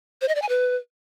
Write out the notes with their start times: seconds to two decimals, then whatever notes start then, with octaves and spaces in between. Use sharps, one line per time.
0.21 C5
0.28 D#5
0.35 D5
0.42 G#5
0.49 B4